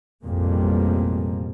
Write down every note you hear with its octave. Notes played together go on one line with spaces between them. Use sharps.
A1 F2 B2 G3 G#3 A#3